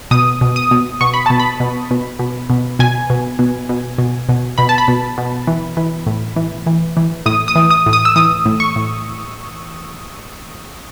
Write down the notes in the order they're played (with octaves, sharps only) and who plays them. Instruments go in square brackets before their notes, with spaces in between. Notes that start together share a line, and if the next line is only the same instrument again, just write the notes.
[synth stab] B2 D#6
B2
D#6
B2
B2 C#6
B5
B2 A5
B5
B2
B2
B2
B2
B2 G#5
B2
B2
B2
B2
B2
B2 B5
A5
B5
B2
B2
E3
E3
A2
E3
E3
E3
A2 D#6
D#6
E3
D#6
A2
D#6
E6
E3 D#6
A2
C#6
A2